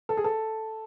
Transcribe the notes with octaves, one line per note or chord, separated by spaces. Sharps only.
A4
G#4
A4